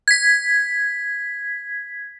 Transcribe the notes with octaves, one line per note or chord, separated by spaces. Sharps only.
G#6 B6